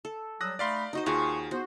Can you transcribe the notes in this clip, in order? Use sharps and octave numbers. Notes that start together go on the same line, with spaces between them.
A4
F#3 G3 D#6 E6 F#6 A#6
A3 D#4 D5 F5 B5 C6
D#4 F#4 C5 D#5
D#2 F4 F#4 G#4 C#6
B3 F#4 C5